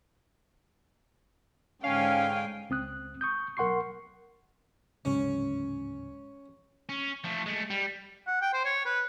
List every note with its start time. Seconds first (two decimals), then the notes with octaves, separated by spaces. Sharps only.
1.84 G#2 D3 C#4 F5 G5 G#5
2.70 C#2 C4 D#6 F#6
3.21 C#6 D#6 G6
3.57 B1 A#4 F#5 C6 C#6 C7
5.05 D1 G#2 C#3 C#4
6.89 C#4
7.24 F3 A3
7.46 G#3 A3
7.70 G3
8.27 F#5
8.41 G5
8.53 C5
8.65 C#5
8.85 B4